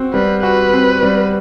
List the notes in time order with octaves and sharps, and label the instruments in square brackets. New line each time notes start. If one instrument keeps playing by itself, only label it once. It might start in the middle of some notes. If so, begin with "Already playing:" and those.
Already playing: [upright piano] C4 F#4
[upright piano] G3 [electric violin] B4
[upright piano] F#4 [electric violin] B4
[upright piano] C4
G3